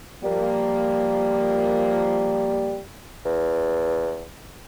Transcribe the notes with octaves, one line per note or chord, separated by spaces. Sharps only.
F3 G3 A#3
E2